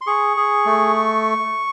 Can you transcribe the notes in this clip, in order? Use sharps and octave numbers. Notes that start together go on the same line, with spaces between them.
C6
G#4 C#6
G#4
A3